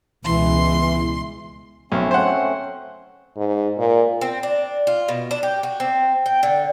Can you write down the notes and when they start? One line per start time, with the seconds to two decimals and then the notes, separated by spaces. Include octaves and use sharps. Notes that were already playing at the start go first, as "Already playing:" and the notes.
0.25 C#2 B2 E3 G#3 C6
1.92 B1 A3 C4 C#4
2.11 C5 F#5
3.37 G#2
3.79 A#2
4.21 C4
4.43 D4
4.87 F4
5.08 B2
5.31 D4
5.43 G4
5.63 F#4
5.80 C4
6.26 G5
6.43 D3